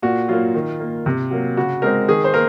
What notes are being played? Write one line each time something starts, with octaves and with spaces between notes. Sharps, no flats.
A#2 F#4
F#3 A#3 F4
D#3
A#3
C3
F#3 A#3
C#3 F#4
G#3 C4 A#4
D#3 G#4
C5
A#3 A#4